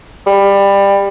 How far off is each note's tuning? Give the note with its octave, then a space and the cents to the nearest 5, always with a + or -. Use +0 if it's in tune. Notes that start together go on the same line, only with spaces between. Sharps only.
G3 +20